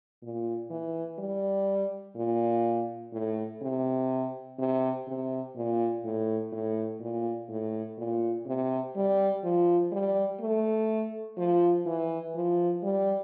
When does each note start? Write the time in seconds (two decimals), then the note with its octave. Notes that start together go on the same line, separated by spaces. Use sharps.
0.23 A#2
0.70 E3
1.19 G3
2.16 A#2
3.13 A2
3.62 C3
4.59 C3
5.07 C3
5.56 A#2
6.04 A2
6.52 A2
7.01 A#2
7.49 A2
7.98 A#2
8.46 C3
8.96 G3
9.44 F3
9.92 G3
10.40 A3
11.38 F3
11.86 E3
12.35 F3
12.83 G3